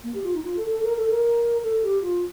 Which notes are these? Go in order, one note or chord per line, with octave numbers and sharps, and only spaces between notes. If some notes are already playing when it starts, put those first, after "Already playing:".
A#3
G4
F4
D#4
F4
A4
A4
A#4
A4
A#4
A4
G4
F4